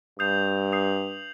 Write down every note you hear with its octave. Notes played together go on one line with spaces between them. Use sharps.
G2 D#6 G6 C7 F7
D#6 G6 C7 F7